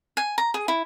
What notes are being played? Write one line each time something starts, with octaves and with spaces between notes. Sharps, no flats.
G#5
A#5
G#4
E4